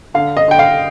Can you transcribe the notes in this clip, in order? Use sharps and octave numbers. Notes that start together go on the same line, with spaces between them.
D3 F5
D#5
D3 G5
F5